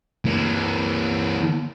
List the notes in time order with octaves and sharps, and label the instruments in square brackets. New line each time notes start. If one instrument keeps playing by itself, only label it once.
[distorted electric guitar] E3 A#3